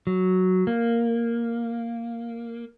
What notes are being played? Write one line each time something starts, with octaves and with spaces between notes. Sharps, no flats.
F#3
A#3